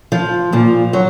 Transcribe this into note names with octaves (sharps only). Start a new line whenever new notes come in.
F3
A#2 F3
F#3